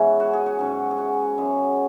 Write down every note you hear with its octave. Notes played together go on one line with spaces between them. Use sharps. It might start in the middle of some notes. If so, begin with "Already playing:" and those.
Already playing: G#2 C#3 E3 G#3 B3 C#4 G#4 B4
F#4
G#4
F#4
G#2 F#3 C#4
G#4
F#4
F#2 C#3 G#3